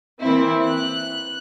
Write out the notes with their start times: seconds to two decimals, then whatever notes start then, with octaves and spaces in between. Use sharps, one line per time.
0.21 E3 A#3 C4 E4
0.64 F#6